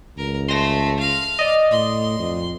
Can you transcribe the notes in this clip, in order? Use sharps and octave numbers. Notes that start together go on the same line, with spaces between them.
C#2 A#4
A3 C6 A#6
F5
D5 D#5
A2 C6
F2